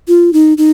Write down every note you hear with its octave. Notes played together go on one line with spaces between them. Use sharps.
F4
D#4
D#4